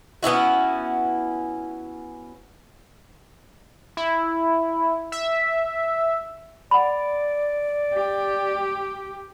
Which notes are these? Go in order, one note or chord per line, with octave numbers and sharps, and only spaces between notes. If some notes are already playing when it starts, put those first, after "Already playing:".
B3 C#4 E4 F#4
E4
E5
D5 F#5 B5
G4